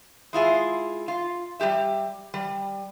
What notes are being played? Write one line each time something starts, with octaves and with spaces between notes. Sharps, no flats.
G#3 E4 F4 G#4
F4
G3 G#3 G4 E5
G3